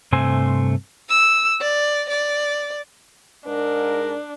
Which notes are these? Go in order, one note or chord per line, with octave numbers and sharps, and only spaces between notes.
G2 C3 A3 C4 C5 G#5
E6
D5
D5
G#2 D4 A#4